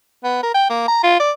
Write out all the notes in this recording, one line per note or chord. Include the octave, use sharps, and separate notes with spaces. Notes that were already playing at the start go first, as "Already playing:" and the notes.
B3
A#4
G5
A#3
A#5
F4
D5